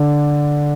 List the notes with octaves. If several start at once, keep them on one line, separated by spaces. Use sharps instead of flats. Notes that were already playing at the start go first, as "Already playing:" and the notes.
Already playing: D3